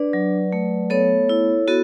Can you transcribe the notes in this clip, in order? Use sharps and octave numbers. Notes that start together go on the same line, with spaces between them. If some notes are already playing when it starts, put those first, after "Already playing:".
Already playing: D4 B4 D5
F#3
A3
B3 A4 C#5
E4
B3 F#4 A4